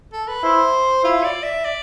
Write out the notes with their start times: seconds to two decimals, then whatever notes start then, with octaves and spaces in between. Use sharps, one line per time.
0.13 A4
0.28 B4
0.43 E4 C5
1.04 E4 F4
1.24 D5
1.44 E5
1.65 D5